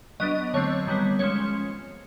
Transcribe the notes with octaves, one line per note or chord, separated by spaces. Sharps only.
F#3 B3 D4 D#5
D3 F#3 A3 C4 C#5
D#3 G3 B3
F3 G#3 C#4 C#5